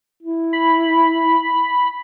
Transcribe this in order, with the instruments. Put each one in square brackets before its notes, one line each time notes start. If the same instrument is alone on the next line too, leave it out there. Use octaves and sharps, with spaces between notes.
[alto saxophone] E4
[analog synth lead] B5